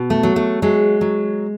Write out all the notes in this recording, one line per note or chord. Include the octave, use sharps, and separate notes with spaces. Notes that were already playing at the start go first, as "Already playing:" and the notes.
Already playing: B2
A3
F#3
A3
F#3 G#3
F#3